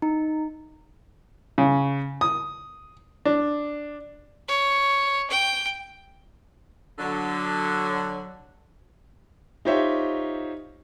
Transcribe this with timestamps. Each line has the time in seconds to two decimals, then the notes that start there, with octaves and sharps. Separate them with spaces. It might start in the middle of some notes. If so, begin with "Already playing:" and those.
0.02 D#4
1.58 C#3
2.21 D#6
3.25 D4
4.49 C#5
5.30 G5
6.99 D3 F#3
9.65 D#4 F4 G4 C5 C#5 E5